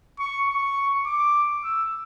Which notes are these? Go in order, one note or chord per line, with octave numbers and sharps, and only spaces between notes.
C#6
C#6
D6
E6